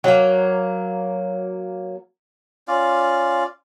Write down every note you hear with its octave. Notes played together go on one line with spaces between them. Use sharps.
F#3 A#3
C#4 F4 D5 F5